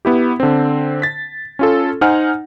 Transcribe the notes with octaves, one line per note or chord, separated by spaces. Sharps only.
B3 E4 G4
D3 C4
A6 B6
C#4 F4 A4
D#4 C5 F#5 G#5 F6